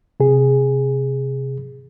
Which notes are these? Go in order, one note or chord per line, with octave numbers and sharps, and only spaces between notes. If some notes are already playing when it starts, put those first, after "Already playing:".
C3 G#4